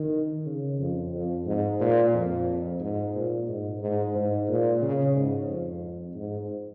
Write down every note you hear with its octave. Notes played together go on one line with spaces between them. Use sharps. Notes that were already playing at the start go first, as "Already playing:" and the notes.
Already playing: D#3
C#3
F2
F2
G#2
A#2
F2
G#2
A#2
G#2
G#2
G#2
A#2
C#3
G#2
F2
G#2